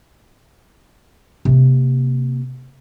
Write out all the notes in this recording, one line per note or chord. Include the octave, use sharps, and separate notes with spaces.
C3 A#3